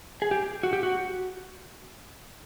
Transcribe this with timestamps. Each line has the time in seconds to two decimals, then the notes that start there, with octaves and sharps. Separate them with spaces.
0.22 G#4
0.31 G4
0.63 F#4
0.73 G4
0.83 F#4